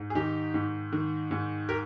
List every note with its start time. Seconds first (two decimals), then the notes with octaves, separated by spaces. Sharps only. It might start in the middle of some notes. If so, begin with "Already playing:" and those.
Already playing: G#2
0.10 G#4
0.15 D#3 D#4 G4
0.54 G#2
0.93 D#3
1.31 G#2
1.69 G4 A#4